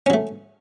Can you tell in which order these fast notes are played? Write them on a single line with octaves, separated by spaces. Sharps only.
C#4 F#3 A3